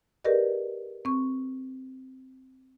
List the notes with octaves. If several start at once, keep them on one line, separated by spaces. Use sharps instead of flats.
G4 G#4 A#4 B4 D5 D#5
C4 C#6